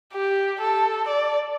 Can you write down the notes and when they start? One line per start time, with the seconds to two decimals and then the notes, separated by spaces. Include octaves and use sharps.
0.13 G4
0.61 A4
1.08 D5